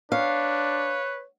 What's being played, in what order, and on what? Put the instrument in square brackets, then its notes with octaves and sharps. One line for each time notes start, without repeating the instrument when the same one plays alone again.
[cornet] D4 [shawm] B4 [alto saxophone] C#5 [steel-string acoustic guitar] F5